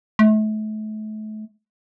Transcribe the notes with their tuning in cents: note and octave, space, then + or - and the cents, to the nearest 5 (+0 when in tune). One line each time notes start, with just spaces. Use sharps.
A3 -35